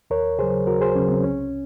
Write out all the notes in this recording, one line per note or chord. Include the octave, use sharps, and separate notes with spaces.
D#2 A#4 C#5
C#3 F#3 G#4 C5
D#2 F#4 A#4
G#4 C5
C#3 F#3 C#4
C4
C2 C#4